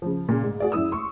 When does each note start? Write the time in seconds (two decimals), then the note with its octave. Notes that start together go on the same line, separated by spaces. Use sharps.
0.02 C#3 F3
0.29 A#2 C#3
0.43 G#2
0.60 F#4 G#4 D5
0.72 F#2 E4 D#6 E6
0.92 C6 C#6